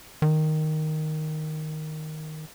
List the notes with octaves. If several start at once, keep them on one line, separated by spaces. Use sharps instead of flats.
D#3